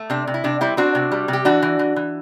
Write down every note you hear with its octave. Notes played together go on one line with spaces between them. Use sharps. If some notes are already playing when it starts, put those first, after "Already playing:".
Already playing: A3
C3 D4
C3
E4
C3 D4
G3 C4 E4
C4 D4 F#4
C3
G3
C3
G4
E3 D4 F#4
E3
E3
E3